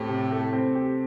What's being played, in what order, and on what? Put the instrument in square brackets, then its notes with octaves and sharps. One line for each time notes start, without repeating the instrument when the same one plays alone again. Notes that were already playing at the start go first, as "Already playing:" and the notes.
Already playing: [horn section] A2 [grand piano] C4 G4
[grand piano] C3
A3
C4
G4